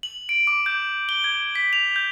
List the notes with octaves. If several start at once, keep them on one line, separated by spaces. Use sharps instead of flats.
F#7
D7
D6
G6
G7
G#6
B6
F7
G6